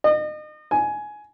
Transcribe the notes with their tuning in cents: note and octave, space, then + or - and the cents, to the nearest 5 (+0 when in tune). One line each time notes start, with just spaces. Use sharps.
D#5 -35
G#5 +15